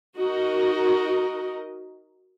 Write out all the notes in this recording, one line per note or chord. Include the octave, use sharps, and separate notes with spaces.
D#4 F#4 A#4 D#5